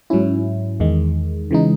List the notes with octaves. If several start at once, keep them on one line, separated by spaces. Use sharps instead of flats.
G#2 F#3 C#4 E4
E2 D#3 G#3
C#3 E3 G#3 D#4